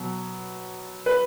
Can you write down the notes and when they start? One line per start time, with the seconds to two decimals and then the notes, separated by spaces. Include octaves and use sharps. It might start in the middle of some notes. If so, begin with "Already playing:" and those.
Already playing: B2 F#3 B3
1.06 B4